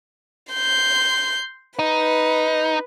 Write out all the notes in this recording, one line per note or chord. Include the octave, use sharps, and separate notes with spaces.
C6 G6
D#4 B4